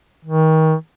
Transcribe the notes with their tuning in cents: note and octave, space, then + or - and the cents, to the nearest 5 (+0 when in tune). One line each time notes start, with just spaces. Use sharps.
D#3 +30